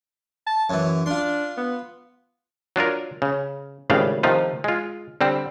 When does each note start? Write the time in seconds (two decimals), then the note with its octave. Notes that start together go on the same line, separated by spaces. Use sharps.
0.47 A5
0.70 F#2 E3 C#5
1.06 D4 F4 C6
1.57 B3
2.76 F#3 D4 F4 A#4
3.22 C#3
3.90 G#1 A2 C#3 G3 D4 F5
4.23 C3 D#3 F3 A3 F4
4.64 G#3 F4
5.21 D3 G3 C4